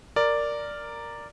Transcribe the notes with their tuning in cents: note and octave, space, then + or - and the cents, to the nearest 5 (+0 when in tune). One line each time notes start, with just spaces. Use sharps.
A#4 -5 D5 +0